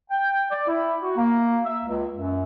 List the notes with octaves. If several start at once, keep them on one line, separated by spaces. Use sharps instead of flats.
G5
D5
E4
F#4
A#3
E5
C#2
F#2